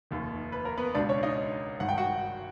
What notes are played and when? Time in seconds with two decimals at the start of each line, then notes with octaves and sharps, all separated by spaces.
0.11 F1 D#2 D#3
0.52 B4
0.65 A#4
0.77 B3 B4
0.95 C#2 B2 D4 D5
1.09 C#4 C#5
1.18 D5
1.23 D#4 D#5
1.80 G#1 G2 D#3 F#5
1.89 G5
1.98 F#4 F#5